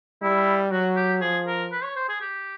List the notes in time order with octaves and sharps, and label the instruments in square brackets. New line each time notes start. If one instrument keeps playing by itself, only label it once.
[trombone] G3 [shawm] E4
[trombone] F#3 [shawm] F#4
[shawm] G4
[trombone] F3 [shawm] G#4
[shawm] A#4
B4
C#5
C5
G#4
G4